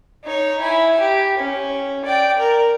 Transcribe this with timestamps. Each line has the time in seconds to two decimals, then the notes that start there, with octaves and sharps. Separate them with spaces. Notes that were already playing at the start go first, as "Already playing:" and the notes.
0.24 D#4 C#5
0.60 E4 G#5
0.99 G4
1.37 C#4
2.05 D5 G5
2.38 A#4